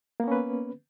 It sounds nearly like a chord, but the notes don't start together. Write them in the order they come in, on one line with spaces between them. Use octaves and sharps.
A#3 B3 C#4 B4